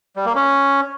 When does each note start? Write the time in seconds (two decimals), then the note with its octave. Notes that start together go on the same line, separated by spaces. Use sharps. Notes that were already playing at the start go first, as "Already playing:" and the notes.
0.16 G3
0.26 A#3
0.35 C#4